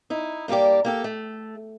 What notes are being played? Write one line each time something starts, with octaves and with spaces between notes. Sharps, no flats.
D#4 E4
G2 A#3 D4 G4 D5
A#3 G4 A4
A3